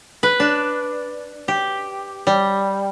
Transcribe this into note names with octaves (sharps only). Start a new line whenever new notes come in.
B4
D4
G4
G3